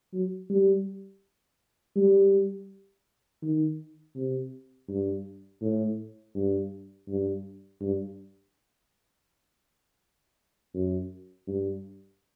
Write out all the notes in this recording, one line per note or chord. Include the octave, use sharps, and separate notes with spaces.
F#3
G3
G3
D#3
C3
G2
A2
G2
G2
G2
F#2
G2